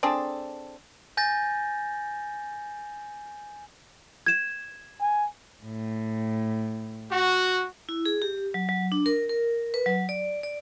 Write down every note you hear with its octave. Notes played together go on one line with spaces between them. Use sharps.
C4 D4 G#4 A4
G#5 G6 A6 A#6
G#6 E7
G#5
A2
F#4
E4
G#4
G4
F#3
F#3
D4
A#4
A#4
B4
F#3
D5
D5